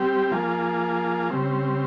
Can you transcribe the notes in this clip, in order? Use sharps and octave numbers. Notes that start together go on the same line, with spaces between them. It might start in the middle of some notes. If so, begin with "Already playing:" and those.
Already playing: G3 C4 G4
F3 A#3 F4 G#4
C#3 G3 C4